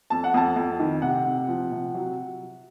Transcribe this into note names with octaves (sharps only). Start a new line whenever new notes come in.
F2 A5
F#5
F2 A5
F2
D#3
C3 F#5
C3
F3
C3
F#3